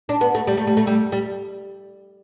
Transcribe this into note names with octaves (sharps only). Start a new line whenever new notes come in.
D4
B3
A3
G3
A3
G3
A3
G3
G3